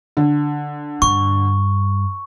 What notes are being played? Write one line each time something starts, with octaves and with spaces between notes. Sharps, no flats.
D3
G2 C#6